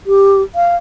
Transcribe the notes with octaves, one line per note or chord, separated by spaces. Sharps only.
G4
F5